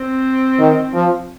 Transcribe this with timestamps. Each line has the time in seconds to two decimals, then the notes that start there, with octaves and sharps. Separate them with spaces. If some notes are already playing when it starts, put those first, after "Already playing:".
Already playing: C4
0.59 D#3
0.94 F3